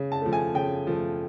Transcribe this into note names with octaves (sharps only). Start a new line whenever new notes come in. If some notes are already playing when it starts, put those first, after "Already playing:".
Already playing: C#3
A5
F3 A3
G#5
C#3 G5
F3 A3